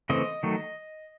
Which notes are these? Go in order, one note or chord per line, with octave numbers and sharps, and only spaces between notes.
C#3 E3 A3 C4 D#5
D#3 F#3 A3